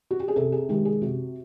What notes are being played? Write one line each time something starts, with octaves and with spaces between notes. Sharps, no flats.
F#4
G4
G#4
C3 A4
G#4
D#3 G#3 G4
G#4
C3 F#4